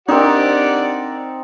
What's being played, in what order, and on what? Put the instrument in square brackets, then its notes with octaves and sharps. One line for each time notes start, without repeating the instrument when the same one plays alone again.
[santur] C4 D#4 [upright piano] D4 A#4 [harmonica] G4 D5 F#5